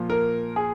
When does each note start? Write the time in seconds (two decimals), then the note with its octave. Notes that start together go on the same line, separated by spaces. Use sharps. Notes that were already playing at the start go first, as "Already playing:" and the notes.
Already playing: A#2 F3
0.10 A#4
0.56 G#4